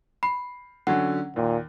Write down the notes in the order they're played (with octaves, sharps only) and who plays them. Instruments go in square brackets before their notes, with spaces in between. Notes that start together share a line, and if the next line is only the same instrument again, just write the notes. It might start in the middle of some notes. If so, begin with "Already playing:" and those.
[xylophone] B5 [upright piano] C7
[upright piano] D3 F#3 C#4 [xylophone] F#5
[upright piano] D#2 [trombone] A#2